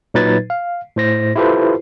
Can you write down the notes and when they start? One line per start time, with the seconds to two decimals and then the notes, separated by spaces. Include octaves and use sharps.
0.14 A#2 F#3 D#4 B4 G#6 A6
0.50 F5
0.96 A2 C5 A#6
1.36 E4 F4 G4 A4 B4 C5